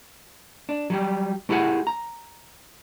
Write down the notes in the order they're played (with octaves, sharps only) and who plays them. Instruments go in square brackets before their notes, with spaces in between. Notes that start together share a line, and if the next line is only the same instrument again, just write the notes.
[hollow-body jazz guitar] D4
F#3 G3 G4
A3 E4 G4 G#4 F#5
A#5